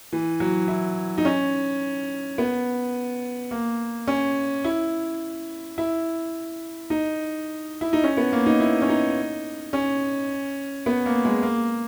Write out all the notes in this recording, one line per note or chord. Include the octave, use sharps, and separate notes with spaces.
E3
F#3
E4
D#4
C#4
B3
A#3
C#4
E4
E4
D#4
E4
D#4
C#4
B3
A#3
D#4
E4
C#4
D#4
C#4
B3
A#3
G#3
A#3